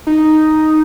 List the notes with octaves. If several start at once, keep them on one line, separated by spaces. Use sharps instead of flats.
D#4